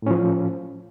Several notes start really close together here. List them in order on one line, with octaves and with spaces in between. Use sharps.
A2 C#4 F3